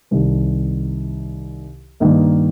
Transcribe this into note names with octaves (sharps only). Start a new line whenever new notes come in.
C2 C3 D#3
G2 D#3 A#3 D#4